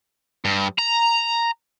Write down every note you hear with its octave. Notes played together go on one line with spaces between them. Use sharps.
G2
A#5